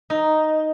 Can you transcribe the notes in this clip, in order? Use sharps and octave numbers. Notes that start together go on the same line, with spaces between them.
D#4